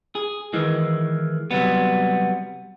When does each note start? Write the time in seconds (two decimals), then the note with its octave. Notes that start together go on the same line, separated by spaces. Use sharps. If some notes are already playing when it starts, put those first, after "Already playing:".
0.15 G#4
0.53 D#3 E3 G#3
1.51 C3 F#3 G3 B3